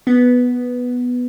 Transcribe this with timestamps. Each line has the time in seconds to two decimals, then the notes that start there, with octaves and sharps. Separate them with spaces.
0.07 B3